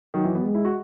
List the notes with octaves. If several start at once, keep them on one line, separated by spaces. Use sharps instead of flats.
D#3 F#3
E3
B3
G#3
E4
F#4